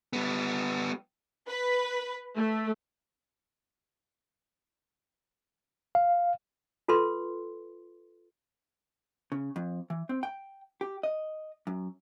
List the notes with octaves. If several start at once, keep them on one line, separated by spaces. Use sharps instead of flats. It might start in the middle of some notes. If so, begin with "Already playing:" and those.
G3 B3
B4
A3
F5
F4 A4 B4 C6
C#3
F2
E3
C4
G5
G4
D#5
F#2